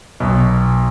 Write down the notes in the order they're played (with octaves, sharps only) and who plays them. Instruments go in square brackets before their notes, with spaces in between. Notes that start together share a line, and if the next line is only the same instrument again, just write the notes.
[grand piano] B1 B2